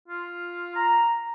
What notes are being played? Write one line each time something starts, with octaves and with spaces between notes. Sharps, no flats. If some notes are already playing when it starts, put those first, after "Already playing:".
F4
A#5